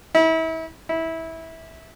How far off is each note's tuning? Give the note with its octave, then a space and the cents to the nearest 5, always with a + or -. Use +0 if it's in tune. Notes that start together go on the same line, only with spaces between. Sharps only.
E4 -35
E4 -20